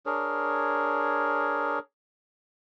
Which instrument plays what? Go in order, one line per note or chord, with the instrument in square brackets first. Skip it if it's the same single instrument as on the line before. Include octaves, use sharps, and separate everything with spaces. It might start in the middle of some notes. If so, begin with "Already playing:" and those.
[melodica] D4 G#4 A#4 C#5